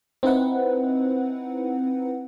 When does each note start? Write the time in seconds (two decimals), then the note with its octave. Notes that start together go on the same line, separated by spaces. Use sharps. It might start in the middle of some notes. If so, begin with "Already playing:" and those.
0.23 C4 D#4 E4 B4 F#5